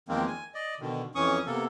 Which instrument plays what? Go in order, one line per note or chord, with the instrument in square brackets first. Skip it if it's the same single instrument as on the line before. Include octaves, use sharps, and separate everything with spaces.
[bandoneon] E2 D#3 F3 G#3 A#3 C4
G#5
D5 D#5
B2 D3 D#3
F2 E3 C#4 C#6 D#6
C3 A#3 B3 A4